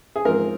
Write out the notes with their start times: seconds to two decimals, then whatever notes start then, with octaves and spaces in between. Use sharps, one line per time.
0.16 G#4
0.25 G#2 F3 C4 A#4